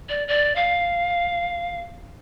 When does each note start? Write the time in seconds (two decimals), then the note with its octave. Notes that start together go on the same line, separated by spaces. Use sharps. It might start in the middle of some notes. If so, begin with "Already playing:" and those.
0.09 D5
0.28 D5
0.56 F5